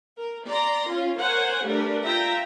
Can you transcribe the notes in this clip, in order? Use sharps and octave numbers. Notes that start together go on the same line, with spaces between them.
A#4
D5 A#5 C6
C#4 F4
A#4 C5 C#5 F#5 G#5
G3 A3 D4 A#4 B4
F4 E5 G5 A#5